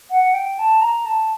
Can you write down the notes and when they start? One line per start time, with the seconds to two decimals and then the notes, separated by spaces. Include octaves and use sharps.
0.11 F#5
0.34 G5
0.59 A5
0.81 A#5
1.06 A5